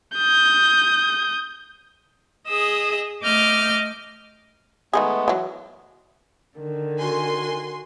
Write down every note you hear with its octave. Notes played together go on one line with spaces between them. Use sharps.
D#6 G6
G#4 D#5 D#6 E6
A3 D#5 D6 F6 G6
D#3 G#3 A3 B3 D#4 G#4
E3 F#3
D3 D#3
F#4 G#5 C6